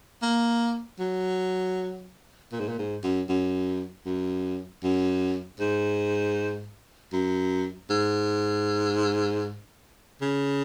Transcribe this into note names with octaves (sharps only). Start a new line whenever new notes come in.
A#3
F#3
A#2
G#2
A#2
G#2
F#2
F#2
F#2
F#2
G#2
F#2
G#2
C#3